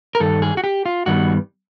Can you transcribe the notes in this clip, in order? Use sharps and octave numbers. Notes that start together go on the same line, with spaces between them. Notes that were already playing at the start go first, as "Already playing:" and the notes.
A#4
G2 D#3 A4
G#4
F#4
G4
F4
G2 D#3 G3 B3 F#4